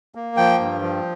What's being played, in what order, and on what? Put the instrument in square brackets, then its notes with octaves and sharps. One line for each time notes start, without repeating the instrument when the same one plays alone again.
[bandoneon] A#3
F3 G5
G2
F3